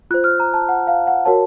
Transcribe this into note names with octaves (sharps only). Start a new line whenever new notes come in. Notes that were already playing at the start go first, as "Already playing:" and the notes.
F4 C5 F#6
F6
A#5
A5
F#5
F5
F#5
F#4 A#4 C#5 A5